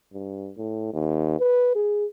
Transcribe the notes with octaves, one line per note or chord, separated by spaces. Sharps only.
G2
A2
D#2
B4
G#4